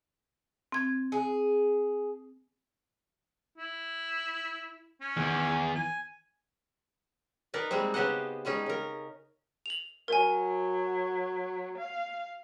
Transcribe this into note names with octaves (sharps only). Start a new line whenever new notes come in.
C4 G#6
G#4
E4
C#4
E2 D#3 E3 B3
G#5
D#4 A#4 B4 D5
G3 G#3 A#3 C4
C#3 B3 G4 C5 D#5 F#5
G3 G#3 C#4 D#4
C#3 A#4
F7 F#7
F#3 A#4 G#5
F5